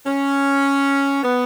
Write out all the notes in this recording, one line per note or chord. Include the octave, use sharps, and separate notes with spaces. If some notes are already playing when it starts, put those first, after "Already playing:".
C#4
B3